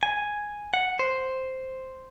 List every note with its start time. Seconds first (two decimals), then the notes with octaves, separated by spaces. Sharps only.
0.03 G#5
0.74 F#5
0.99 C5